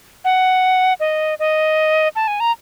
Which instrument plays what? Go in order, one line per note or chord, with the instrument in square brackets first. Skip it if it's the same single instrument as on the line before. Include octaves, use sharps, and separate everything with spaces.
[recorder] F#5
D#5
D#5
A5
G#5
A#5